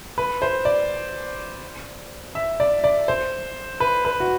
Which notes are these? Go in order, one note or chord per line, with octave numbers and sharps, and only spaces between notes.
B4
C5
D5
E5
D5
D5
C5
B4
B4
F#4